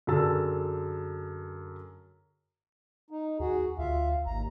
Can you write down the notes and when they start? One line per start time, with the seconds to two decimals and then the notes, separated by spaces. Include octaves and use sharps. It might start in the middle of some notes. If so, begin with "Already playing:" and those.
0.07 F#2 D3 G#4 A5 E6
3.11 D#4
3.40 D#2 F#4 G#4
3.78 D2 F4 E5 F5
4.26 G#1 D#2 A#5